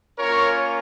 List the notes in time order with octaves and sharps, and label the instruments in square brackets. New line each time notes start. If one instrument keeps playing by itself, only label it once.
[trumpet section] A#3 C#4 F4 A#4 C#5